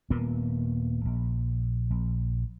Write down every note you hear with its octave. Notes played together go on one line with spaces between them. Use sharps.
D#1 A#2 A#3 B3
A#1
A#1